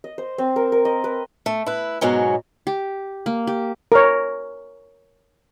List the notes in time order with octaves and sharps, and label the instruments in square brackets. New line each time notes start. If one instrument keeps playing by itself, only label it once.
[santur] D#5
C5
C4
A#4
A#4
D#5
B4
[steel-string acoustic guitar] A3
E4 B4
G#2 B2 F#3 C#4
[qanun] G4
A#3
G4
[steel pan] A#4 C#5